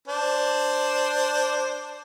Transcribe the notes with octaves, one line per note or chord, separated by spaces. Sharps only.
D4 C5